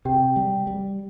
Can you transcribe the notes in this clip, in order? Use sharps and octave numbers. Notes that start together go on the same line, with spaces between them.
C3 G4 G5
G3
G3